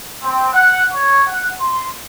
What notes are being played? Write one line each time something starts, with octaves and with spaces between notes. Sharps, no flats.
C4
F#5
C#5
F#5
C6